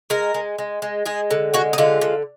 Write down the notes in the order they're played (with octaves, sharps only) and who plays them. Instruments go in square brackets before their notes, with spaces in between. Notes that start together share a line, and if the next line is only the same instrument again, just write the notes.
[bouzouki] G#3 A#4
G#3
G#3
G#3
G#3 G#4
D3
G#3 F#4
D#4
D3 F4
D3